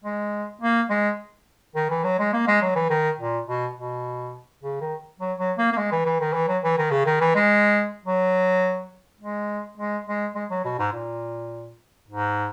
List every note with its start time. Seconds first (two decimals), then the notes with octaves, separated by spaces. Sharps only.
0.05 G#3
0.62 A#3
0.90 G#3
1.76 D#3
1.91 E3
2.04 F#3
2.19 G#3
2.33 A#3
2.48 G#3
2.62 F#3
2.76 E3
2.90 D#3
3.19 A#2
3.48 B2
3.76 B2
4.63 C#3
4.81 D#3
5.20 F#3
5.39 F#3
5.58 A#3
5.72 A#3
5.77 G#3
5.92 E3
6.06 E3
6.20 D#3
6.34 E3
6.48 F#3
6.64 E3
6.78 D#3
6.91 C#3
7.06 D#3
7.21 E3
7.35 G#3
8.06 F#3
9.21 G#3
9.78 G#3
10.07 G#3
10.35 G#3
10.51 F#3
10.65 B2
10.79 G#2
10.93 A#2
12.08 G#2